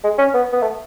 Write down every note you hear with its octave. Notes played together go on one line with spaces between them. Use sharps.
G#3
C#4
B3
B3
A3